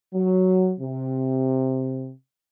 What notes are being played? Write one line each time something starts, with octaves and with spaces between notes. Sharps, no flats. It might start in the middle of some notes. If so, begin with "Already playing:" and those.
F#3
C3